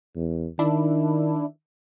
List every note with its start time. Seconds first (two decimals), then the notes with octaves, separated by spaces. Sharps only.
0.16 E2
0.59 D#3 D4 E4